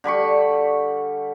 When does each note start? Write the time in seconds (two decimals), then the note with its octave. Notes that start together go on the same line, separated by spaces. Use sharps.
0.04 D3 G3 B5 C#6